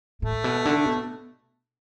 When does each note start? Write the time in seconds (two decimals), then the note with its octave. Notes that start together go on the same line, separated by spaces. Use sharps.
0.22 A2 A3
0.44 B2
0.65 D3
0.86 B2